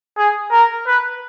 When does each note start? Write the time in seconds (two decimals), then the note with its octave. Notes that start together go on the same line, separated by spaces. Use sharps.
0.17 G#4
0.51 A#4
0.87 B4